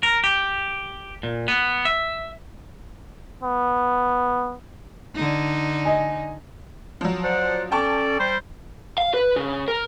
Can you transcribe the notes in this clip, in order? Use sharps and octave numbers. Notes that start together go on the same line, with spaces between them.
A#4
G4
A#2
B3
E5
B3
D3 D#4
D#5 G#5
F3 F#3
C5 D5 F#5
C#4 A4 D5 G5 A5 C#6
G3 C5
F5
B4
C#3
A#4